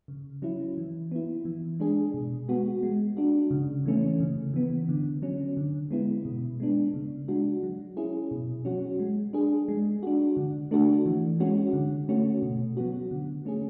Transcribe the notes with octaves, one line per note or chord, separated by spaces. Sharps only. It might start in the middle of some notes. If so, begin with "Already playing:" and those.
C#3
F#3 C#4 E4
E3
B3 E4
E3
G#3 D4 G#4
B2
G#3 B3 F#4
G#3
D4 F#4
C#3
E3 A3 C#4
C#3
E3 B3
D3
F#3 C#4
D3
G#3 B3 E4
B2
G#3 B3 D4
C#3
G#3 D4 F#4
F#3
C#4 E4 G#4
B2
F#3 C#4 F#4
G#3
D4 G#4
G#3
D4 F#4
D3
A3 D4 F#4
E3
G#3 C#4 F#4
D3
A3 C#4 F#4
B2
F#3 B3 F#4
D3
A3 C#4 G#4